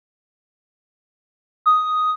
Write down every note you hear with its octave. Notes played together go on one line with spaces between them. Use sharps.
D#6